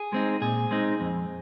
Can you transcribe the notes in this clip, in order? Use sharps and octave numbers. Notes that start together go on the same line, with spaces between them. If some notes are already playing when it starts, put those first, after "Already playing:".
Already playing: G#4
G#3 C4 D#4
A#2 G#4
G#3 C4 D#4
F2